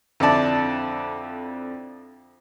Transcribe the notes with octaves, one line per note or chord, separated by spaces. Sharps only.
F2 D3 E4 D5 A5